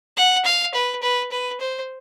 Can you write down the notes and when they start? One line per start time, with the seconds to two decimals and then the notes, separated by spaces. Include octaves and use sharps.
0.17 F#5
0.45 F5
0.74 B4
1.02 B4
1.31 B4
1.60 C5